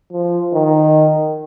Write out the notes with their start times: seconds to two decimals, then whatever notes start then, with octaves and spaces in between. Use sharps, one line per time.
0.13 F3
0.53 D#3